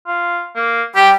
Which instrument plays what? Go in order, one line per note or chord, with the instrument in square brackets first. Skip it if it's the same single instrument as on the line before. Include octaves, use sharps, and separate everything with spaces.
[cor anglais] F4
A#3
[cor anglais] G3 [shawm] G4 [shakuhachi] G5